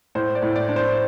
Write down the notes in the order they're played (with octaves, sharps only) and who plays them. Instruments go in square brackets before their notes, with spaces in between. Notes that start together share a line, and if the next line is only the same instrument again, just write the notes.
[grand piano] A2 C5
D5
A2
D5
D4
C5